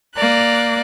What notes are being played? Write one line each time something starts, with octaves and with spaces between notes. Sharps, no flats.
A#3 D5 F#6